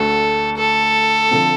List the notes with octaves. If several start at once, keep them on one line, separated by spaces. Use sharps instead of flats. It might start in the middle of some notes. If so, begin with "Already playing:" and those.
Already playing: D2 D3 A3 A4
A4
D3 F3 C4